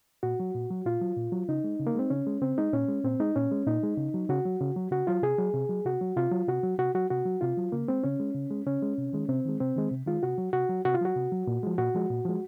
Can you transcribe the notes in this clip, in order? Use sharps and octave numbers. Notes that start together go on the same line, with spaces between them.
A#2 F#4
F#3
A#2
F#3
A#2 F4
F#3
A#2
F#3
C#3 D#4
G#3
C#3
A#3
G#3 C4
C#3 C#4
G#3
C#3 C4
G#3 D#4
A#2 C#4
G#3
A#2 C4
G#3 D#4
A#2 C#4
G#3
A#2 D#4
G#3
C#3
F#3
C#3 F#4
F#3
C#3
F#3
C#3 F#4
F#3 F4
C3 G#4
F#3
C3
F#3
C3 F#4
F#3
C3 F4
F#3
C3 F#4
F#3
C3 F#4
F#3 F#4
C3 F#4
F#3
C3 F4
F#3
C#3 A#3
G#3 C4
C#3 C#4
G#3
C#3
G#3
C#3 C#4
G#3
C3
D#3 G#3
C3 C4
D#3 G#3
C3 C4
D#3 G#3
C3
D#3 G#3 F4
C3 F#4
F#3
C3 F#4
F#3
C3 F#4
F4
F#3 F#4
C3
F#3
A#2
F3 G#3
A#2 F#4
F3 G#3
A#2
F3 G#3